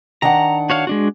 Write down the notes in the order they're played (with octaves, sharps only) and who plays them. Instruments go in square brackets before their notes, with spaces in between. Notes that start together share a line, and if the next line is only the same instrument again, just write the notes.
[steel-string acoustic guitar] D#3 D4 F#5 [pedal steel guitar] A#5
[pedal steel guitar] F#4 C#5 F5
G#3 D4 F#4